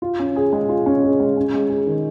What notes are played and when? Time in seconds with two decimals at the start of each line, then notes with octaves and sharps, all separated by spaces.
0.02 F4
0.19 C#4
0.36 G#4
0.53 G#3
0.69 F4
0.86 C#4
1.03 G#4
1.20 G#3
1.37 C#4
1.54 G#3
1.70 G#4
1.86 D#3